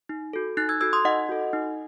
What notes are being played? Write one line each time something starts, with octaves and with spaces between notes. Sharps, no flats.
D#4
F#4 A4
D#4 F#6 A6
E6 G#6
F#4 A4 E6 G#6
C6 D#6
D#4 D#5 F#5
F#4 A4
D#4